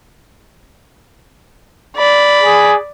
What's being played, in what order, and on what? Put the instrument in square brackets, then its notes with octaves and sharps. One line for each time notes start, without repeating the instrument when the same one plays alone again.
[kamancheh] D5 B5
[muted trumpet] G#4